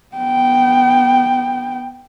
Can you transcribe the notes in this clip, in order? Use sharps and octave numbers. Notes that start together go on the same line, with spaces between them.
B3 G5